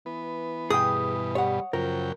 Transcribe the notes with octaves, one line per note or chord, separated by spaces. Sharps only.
E3 B3
G2 B2 G#4 G5 D#6
G3 C#5 F#5
F#2 C#3 F3 A#4 G5